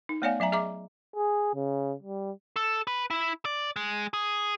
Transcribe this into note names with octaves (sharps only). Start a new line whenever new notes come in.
D#4
A3 B3 C#5 D5 F5 G#5
F#3 E5 G#5 A#5
G#4 D#5 E5 A#5 D6
G#4
C#3
G3
A4
B4
E4
D5
G#3
G#4